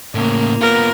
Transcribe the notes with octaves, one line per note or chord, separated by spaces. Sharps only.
A2 C#3 A#3
B3 F4 A#4